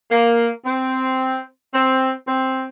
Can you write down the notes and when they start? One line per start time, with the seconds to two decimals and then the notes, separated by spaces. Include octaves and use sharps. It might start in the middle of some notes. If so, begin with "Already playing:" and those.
0.11 A#3
0.65 C4
1.74 C4
2.27 C4